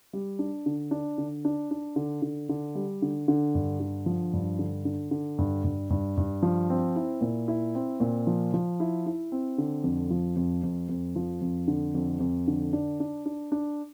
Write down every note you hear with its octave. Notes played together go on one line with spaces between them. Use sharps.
G3
D4
D3
D4
D3
D4
D4
D3
D3
D3
G3
D3
D3
G2
D3
F3
G2
D3
D3
D3
G2
G2
G2
G2
F3
C4
E4
A#2
E4
C4
A#2
F3
F3
E4
E4
C4
D3
F2
F3
F2
F2
F2
F3
F2
D3
F2
F2
D3
D4
D4
D4
D4